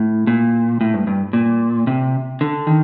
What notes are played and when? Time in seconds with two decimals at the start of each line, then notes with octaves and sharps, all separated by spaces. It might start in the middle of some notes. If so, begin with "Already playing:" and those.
Already playing: A2
0.27 A#2
0.81 A2
0.94 G2
1.07 G2
1.33 A#2
1.87 C3
2.41 D3
2.67 D#3